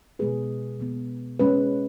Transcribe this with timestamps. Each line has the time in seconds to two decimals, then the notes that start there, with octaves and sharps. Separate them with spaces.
0.19 B2 G#3 B3 G#4 B4
0.79 B2 G#3 B3
1.39 G#3 C#4 B4